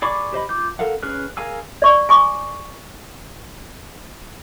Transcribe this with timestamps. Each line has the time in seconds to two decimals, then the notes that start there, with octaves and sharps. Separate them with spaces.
0.02 G#4 D5 B5 C#6 D6
0.33 G4 C5 D#5 B5
0.49 F4 D6 G6
0.79 A4 A#4 F5 F#5
1.03 C#4 G#4 B4 F6 F#6
1.37 G#4 A#4 F5 G#5 E6
1.82 D5 C#6
2.09 G#5 C#6 D6